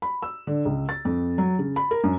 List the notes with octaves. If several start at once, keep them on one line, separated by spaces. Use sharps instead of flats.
B5
E6
D3
C#2
A6
F2
F#3
C#3
B5
A#4
F#2